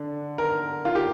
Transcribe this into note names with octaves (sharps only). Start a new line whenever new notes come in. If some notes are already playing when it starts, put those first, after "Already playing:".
Already playing: D3 D4
A#4
F4
G4